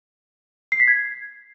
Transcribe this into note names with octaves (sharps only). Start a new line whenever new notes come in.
C7
B6
G#6